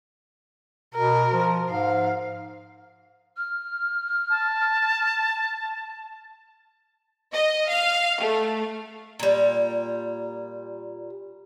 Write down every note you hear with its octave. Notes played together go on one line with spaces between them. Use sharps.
B2 A#4
F3
G#2 F5
F6
A5
D#5
F5
A3
A#2 G3